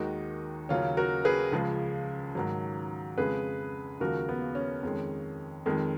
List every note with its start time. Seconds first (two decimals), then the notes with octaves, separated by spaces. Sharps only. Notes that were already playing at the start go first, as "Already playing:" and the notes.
Already playing: D#2 D#3 G#3 D#4 F#4
0.69 D#2 C#3 F#3 C#4 F4
0.97 F#4 A#4
1.25 G#4 B4
1.52 C#2 C#3 F3 G#3
2.35 G#2 D#3 F#3
3.17 F2 C#3 G#3 G#4 B4
4.00 D#2 C#3 F3 G#3 F#4 A#4
4.29 B3
4.55 C#4
4.83 F2 D#3 G#3
5.66 F2 D#3 G#3